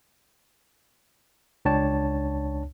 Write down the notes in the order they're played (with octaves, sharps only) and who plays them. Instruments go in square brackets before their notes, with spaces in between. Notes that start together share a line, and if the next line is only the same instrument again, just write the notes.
[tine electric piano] C#2 D4 C#5 G5 A5